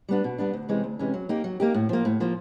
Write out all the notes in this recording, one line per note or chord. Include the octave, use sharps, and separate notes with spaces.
G3 B3 D4
B2
G3 B3 D4
D2
C3 E3 G#3 C#4
D2
C3 E3 G#3 C#4
F#3
A#3 D#4 G4
F#3
A#3 D#4 G4
A2
F3 A#3
A2
F3 A#3